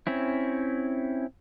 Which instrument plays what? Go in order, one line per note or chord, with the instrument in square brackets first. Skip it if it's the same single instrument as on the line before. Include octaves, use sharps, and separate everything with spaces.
[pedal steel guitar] C4 C#4 E4